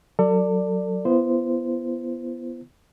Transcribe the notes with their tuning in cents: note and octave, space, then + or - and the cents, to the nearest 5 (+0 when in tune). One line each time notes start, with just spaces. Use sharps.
F#3 +0 A4 +35 D5 +0
B3 +0 E4 +45 C5 -15